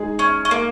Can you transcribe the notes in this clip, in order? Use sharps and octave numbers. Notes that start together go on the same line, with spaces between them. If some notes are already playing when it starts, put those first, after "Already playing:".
Already playing: G#3 D#4 G#4
C#4
C#4
A#3